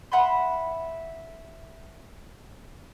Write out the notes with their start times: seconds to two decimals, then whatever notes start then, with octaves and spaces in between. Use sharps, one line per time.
0.12 E5 F#5 B5 C6